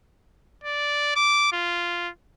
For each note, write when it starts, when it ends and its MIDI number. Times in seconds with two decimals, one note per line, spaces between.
0.64 1.15 74
1.16 1.52 86
1.52 2.09 65